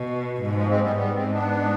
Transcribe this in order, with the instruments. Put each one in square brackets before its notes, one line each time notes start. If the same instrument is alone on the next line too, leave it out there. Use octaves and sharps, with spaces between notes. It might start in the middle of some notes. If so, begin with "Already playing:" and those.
Already playing: [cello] B2
[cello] G#2 [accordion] B2
[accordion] F3 G#3
G#3 C4
G3 B3
[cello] G#2 [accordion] G3 B3
[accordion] G#3 C4
B3 D4